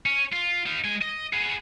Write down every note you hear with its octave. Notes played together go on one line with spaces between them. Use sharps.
C#4
F4
D#4 F5
G#3 G#5
D#5
B3 G#4